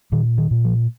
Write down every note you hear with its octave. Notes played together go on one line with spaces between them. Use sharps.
A#2 D#3
D#3
A#2
F3